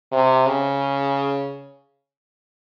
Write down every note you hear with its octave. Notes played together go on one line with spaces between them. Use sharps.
C3
C#3